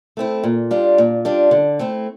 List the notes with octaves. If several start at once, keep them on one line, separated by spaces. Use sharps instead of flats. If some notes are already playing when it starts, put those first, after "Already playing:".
A3 C4 E4
A#2
G3 D4 F4
A#2
G3 D4 F4
D3
A3 C4 E4